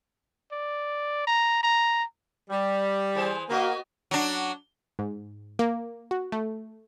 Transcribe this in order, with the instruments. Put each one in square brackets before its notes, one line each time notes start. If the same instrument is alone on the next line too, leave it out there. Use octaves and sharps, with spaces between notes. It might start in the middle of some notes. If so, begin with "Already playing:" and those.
[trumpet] D5
A#5
A#5
[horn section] G3
[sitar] E3 G#4 C5
[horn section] A#3 [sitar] B3 F#4 D#5
[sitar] F#3 D4
[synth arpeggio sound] G#2
A#3
F#4
A3